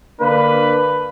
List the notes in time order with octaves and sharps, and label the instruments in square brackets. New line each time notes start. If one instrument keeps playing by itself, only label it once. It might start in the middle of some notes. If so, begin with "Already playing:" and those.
[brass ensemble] D3 A#3 D4 B4